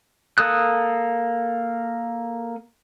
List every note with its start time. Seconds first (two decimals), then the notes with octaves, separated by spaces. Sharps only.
0.38 A#3 A4 D#6 F#6